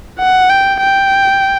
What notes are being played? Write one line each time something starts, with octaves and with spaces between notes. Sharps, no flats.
F#5
G5
G5